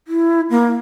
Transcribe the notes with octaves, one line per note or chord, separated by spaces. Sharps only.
E4
A#3